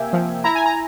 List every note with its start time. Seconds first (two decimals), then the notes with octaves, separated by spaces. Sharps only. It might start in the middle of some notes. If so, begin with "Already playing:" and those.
Already playing: C3 A#3 E5 G5 G#5
0.13 F3
0.44 E4 A#5
0.55 G#5
0.66 A#5